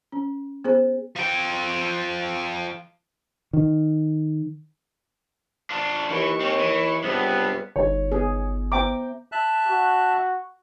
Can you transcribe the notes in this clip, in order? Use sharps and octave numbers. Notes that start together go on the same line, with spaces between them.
C#4
B3 G#4 C5
F3 G5
D#3
D4 F4
D#2 E3 C#6
C4 C#5
E3
C#2 G2 C3 B3
G1 D3 G3 D#4 C#5
B3 G#4
B3 C5 E5 G5 A#5 D6
E5 A5 F#6
F#4